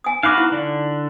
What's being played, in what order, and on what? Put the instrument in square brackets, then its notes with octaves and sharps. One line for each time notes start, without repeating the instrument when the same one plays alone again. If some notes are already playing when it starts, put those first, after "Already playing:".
[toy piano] G#5 D#6
[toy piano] D#4 D6 [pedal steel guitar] F#4 B4 F5
[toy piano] E4
[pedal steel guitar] D3 D4